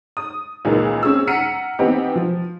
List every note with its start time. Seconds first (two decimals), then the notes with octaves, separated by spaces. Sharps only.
0.17 D#6
0.65 C#2 A#2 D#3 E3 G#3 A#3
1.03 C4 C#4 G#4 E6
1.27 F#5 A#5 F6 B6 C#7 D#7
1.79 E3 B3 C4 D#4 G4
2.15 F3